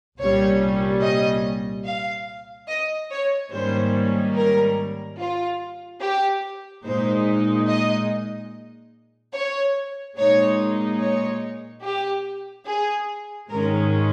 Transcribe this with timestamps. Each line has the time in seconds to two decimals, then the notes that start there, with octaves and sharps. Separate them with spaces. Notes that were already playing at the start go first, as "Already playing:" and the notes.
0.19 C2 A#2 G3 C#4 C#5
1.02 D#5
1.86 F5
2.68 D#5
3.10 C#5
3.52 G#2 D#3 G3 A#3 C#4 C5
4.34 A#4
5.18 F4
6.01 G4
6.84 A#2 G#3 D#4 C5
7.68 D#5
9.34 C#5
10.17 A#2 G#3 D#4 C#5
11.00 C#5
11.83 G4
12.66 G#4
13.49 G#2 D#3 G#3 C#4 A#4